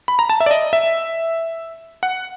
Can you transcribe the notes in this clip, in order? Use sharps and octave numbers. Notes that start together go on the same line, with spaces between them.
B5
A#5
A5
E5
D5
D#5
E5
F#5